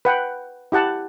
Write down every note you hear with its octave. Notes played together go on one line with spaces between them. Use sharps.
B4 F#5 G5
E4 G4 F#5 A5